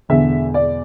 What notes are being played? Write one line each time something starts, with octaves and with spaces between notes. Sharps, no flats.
E1 E2 D3 E5
D5